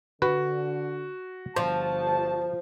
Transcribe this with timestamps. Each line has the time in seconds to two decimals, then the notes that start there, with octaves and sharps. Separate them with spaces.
0.22 D3 F#4 B4
1.56 G1 F3 C5 A5